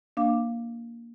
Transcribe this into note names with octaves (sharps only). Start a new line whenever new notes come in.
A#3 D4 F5 D6